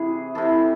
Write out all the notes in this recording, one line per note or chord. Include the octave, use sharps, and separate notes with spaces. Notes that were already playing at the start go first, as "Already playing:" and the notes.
Already playing: C3 E3 G#4
C3 E3 A4